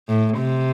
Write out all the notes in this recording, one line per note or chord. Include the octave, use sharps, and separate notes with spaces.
A2
C3